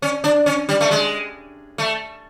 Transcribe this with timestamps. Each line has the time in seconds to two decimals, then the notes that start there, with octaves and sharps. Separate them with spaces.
0.02 C#4
0.24 D4
0.46 C#4
0.69 G3
0.81 A3
0.91 G#3
1.78 A3